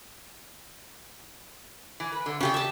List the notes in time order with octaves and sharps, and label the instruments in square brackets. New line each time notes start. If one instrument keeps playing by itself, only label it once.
[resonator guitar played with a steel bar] E3
B4
D3
[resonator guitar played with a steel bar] C#3 [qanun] D4 G4 G5
[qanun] E5 A5